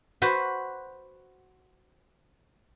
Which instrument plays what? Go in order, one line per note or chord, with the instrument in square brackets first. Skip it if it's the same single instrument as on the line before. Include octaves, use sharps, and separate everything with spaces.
[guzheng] F#4 B4 C5